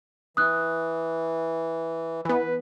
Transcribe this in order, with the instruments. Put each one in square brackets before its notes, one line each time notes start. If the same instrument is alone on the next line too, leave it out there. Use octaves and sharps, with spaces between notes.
[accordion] E3 [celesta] D#6 F#6
[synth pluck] E3 B3 [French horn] B4